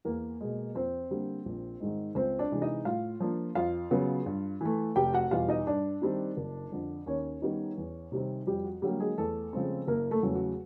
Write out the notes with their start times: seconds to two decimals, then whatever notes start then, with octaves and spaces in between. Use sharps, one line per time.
0.05 E2 A#3 A#4
0.41 B2 G#3
0.75 F2 C4 C5
1.11 D3 G3 A#3
1.46 A#1
1.80 G#2 D#3 G#3
2.15 C#2 C4 C5
2.39 D4 D5
2.51 C3 E3 G#3
2.62 D#4 D#5
2.85 A2 F4 F5
3.20 F3 A#3 D4
3.55 F2 F4 F5
3.91 C#3 F#3 B3
4.26 G2
4.61 E3 A3
4.96 F1 G4 G5
5.13 F#4 F#5
5.31 E2 B2 G3 F4 F5
5.48 D#4 D#5
5.67 G2 D4 D5
6.02 D#3 G3 C4
6.37 F#1
6.72 F2 D3
7.06 D#2 C#4 C#5
7.42 D#3 G3 B3 D#4
7.78 E2
8.12 C3 D#3 G3 C4
8.47 F2 G3 G4
8.64 F#4
8.82 D3 F#3 G3 A#3 G4
9.00 G#3 G#4
9.18 E2 A3 A4
9.53 C#3 F3 G#3 C4
9.87 F#1 A#3 A#4
10.11 A3 A4
10.23 E2 C#3 F#3 A3
10.35 F#4